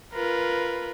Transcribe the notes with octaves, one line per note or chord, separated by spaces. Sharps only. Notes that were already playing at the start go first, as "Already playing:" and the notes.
F4 A#4 B4